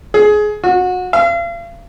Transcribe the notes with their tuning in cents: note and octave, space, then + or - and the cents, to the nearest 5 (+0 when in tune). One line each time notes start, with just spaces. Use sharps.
G#4 +20
F#4 -25
F5 -40